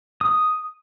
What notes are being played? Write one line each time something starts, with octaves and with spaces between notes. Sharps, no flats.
D#6